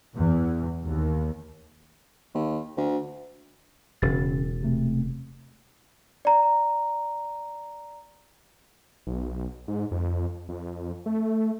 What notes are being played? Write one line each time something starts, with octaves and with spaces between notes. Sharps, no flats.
E2
D#2
D#2
D2
E1 C#3 C#4 A6
C3 A3 C4
D5 A#5
B1
G#2
F2
F2
A3